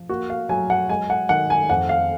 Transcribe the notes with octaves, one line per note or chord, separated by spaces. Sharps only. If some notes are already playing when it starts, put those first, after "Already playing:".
Already playing: F3
A#3 F#4
F5
F#3 G#5
F#5
G#3 G#5
F#5
D#3 F#5
G#5
F2 F#5
F5